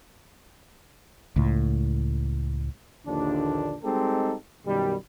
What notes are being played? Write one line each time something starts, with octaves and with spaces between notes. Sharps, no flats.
C#2 A2
A#1 D#2 D3 F3 D4
G3 G#3 C4 D#4 G4 A4
F#2 B2 D#3 G3